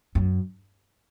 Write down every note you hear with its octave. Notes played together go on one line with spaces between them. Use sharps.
F#2